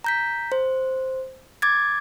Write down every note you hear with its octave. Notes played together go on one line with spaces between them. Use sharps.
A#5 G6 B6
C5
D6 G#6 A6